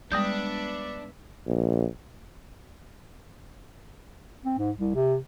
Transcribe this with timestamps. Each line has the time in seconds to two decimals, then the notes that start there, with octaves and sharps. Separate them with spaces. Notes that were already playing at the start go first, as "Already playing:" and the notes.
0.12 G3 G#3 B3 D4 E5 D#6 G6
1.46 A#1
4.45 C4
4.58 G#2
4.79 C2
4.95 C3